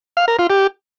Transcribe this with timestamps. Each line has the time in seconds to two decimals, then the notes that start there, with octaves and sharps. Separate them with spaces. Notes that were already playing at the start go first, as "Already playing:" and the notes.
0.17 F5
0.28 A#4
0.39 F4
0.50 G4